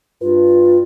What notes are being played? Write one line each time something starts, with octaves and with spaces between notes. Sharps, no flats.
G2 F4 B4